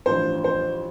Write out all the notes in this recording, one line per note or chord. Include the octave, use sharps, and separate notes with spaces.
A1 G2 F3 C5
C5